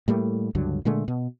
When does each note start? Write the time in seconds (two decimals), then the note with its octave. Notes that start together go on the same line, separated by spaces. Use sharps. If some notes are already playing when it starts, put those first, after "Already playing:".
0.08 A2 G3 A3 A#3
0.55 C#2 G2 D3 F#3
0.85 A#2 D3 G#3 A3
1.08 B2